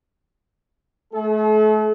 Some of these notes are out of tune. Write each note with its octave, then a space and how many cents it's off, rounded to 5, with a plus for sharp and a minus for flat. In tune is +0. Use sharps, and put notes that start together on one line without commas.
A3 -35 A4 -45